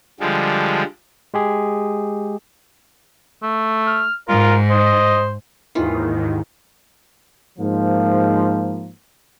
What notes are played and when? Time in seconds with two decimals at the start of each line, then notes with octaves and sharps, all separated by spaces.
0.20 D3 F3 G3 G#3
1.34 G#3 G4 G#4
3.43 A3
3.87 F6
4.29 G#2 F4 A#4
4.70 C5 D#5
5.75 D#2 G#2 D#3 E3 F4
7.58 G#2 F3 A#3